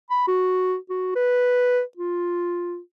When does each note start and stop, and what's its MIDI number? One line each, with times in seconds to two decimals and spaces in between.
0.10 0.25 83
0.28 0.76 66
0.90 1.14 66
1.15 1.82 71
1.97 2.79 65